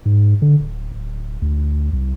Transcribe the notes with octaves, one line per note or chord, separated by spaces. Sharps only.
G#2
D3
D1
D1
D2
C2